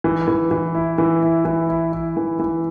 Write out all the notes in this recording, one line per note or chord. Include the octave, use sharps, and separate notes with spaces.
E3
E3
E3
E4
E3
E4
E3
E4
E4
E3
E3